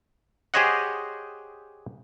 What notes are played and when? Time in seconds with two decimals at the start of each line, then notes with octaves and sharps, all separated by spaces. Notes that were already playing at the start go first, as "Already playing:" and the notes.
0.54 G4 G#4 C5 C#5 D#5 F#5